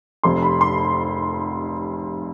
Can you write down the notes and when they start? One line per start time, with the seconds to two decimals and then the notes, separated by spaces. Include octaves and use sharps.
0.24 F1 F2 C3 C6
0.42 B5
0.61 C6